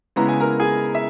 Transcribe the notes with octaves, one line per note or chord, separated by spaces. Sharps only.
C#3 G#3 B3 E4 A#5
G#5
A#4 A#5
G#4 G#5
E5